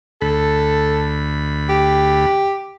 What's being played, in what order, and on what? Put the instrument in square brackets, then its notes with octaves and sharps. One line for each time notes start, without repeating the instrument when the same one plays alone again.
[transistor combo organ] D2 B5 [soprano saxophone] A4
[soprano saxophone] G4